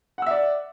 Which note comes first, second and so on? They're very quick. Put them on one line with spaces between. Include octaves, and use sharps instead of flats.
F#5 E6 E5 D5